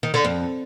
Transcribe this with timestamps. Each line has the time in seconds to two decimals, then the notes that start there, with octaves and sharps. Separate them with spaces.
0.03 D#3
0.14 D3
0.25 F2